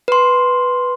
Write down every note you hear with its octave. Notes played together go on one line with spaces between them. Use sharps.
B4 C6